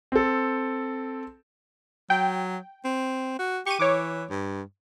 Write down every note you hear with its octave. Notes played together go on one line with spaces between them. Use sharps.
C4 A4
F#3 G5
C4
F#4
G4 C#6 D#7
E3 C#5 D6
G2